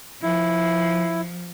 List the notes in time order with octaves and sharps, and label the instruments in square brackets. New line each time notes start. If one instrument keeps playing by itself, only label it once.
[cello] F3 [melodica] E4